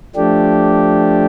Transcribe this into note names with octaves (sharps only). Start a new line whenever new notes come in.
F3 A3 D4 G4